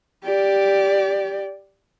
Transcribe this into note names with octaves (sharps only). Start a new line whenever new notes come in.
G4 D5